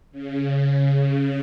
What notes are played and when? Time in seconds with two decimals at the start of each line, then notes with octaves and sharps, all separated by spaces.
0.12 C#3
0.52 C#3